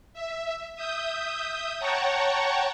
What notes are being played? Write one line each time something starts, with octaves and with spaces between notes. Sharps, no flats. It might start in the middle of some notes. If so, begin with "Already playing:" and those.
E5
E5 D#6 G6
C#5 F#5 G5 A5 A#5 C#6